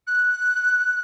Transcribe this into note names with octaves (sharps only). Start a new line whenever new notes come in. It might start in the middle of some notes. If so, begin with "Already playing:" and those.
F#6